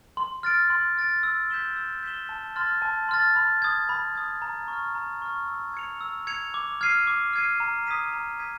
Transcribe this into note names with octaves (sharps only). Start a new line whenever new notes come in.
C6
F6 A6 D7
C6
F6 A6 D7
E6
G6 B6 E7 G7
E6
G6 B6 E7 G7
A5
C6 F6 A6
A5
C6 F6 A6
B5
D#6 G#6
B5
D#6 G#6
A#5
C#6
F6
A#5
C#6 F6
E6
G#6 C#7 F7
E6
G#6 C#7 F7
D6
F6 G#6 C7 D#7
D6
F6 G#6 C7 D#7
A#5
D#6 G#6 B6 D#7
A#5
D#6 G#6 B6 D#7